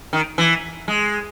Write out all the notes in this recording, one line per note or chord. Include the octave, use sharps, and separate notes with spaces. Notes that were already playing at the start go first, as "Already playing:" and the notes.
D#3
E3
G#3